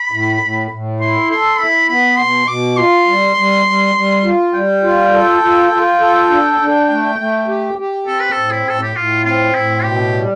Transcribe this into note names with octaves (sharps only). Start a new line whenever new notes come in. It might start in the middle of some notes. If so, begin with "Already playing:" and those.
Already playing: B5
A2
A2
A2
E4 C6
A4 C6
E4 B5
B3 B5
B2 C6
B2 D6
F4 C6
G3
G3
G3
G3
F4
G3 G5
F4
A4
F4
F4
A4
D4
D4
A3
A3
G4
G4
C4 A4
B4
A4
A2
E4
A2 A4
G4
A2 F4
C4 F4
A2 E4
B2 G4
G3